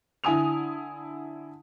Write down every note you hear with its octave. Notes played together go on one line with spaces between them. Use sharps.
D3 E4 G#5 D#6 F7